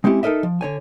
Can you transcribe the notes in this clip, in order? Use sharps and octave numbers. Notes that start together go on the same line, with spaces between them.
G#3 C4 C#4 E4 G4
D#4 A4 A#4 D#5 E5
F3
D3 C#5 G#5